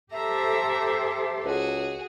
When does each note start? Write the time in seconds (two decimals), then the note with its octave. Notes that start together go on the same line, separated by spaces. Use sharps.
0.12 G4 A4 C5 E5 A#5
1.45 C#2 F#4 G#4